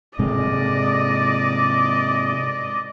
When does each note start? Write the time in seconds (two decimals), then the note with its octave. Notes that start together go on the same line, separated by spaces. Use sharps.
0.19 G#2 C3 G#3 D5 D#5